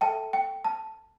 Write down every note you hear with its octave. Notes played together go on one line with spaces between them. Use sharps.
A4 E5 G5 A5
G5
A5